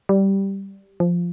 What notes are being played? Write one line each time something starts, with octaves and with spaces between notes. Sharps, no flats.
G3
F3